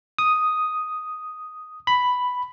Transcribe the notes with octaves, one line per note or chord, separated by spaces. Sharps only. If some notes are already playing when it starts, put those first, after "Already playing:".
D#6
B5